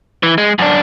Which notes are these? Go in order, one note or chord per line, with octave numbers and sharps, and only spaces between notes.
E3
G#3
F#2 D4